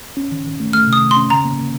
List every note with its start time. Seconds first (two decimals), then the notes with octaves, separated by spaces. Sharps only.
0.17 C#4
0.32 D#3
0.46 D#3
0.60 A3
0.73 A3 F6
0.87 C3
0.93 D#6
1.02 D#3
1.11 C6
1.17 C#4
1.30 C#3 A#5
1.45 A#3
1.58 A#3